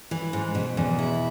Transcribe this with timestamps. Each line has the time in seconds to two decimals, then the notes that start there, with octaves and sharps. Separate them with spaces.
0.11 E3
0.33 G#2
0.55 B2
0.77 E2
0.99 E4